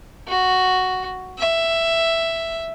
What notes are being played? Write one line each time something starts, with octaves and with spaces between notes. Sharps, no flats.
F#4
E5